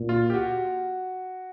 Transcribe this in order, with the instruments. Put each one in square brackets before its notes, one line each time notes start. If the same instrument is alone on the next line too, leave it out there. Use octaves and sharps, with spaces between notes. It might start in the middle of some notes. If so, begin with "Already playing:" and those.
Already playing: [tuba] A#2
[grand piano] F4
G4
F#4